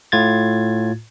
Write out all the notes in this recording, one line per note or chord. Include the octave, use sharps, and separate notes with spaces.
A2 F4 G#6 A6